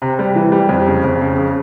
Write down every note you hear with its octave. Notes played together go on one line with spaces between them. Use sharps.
C3
G3
E3
G3
F2
C#3
F2
C#3
C#3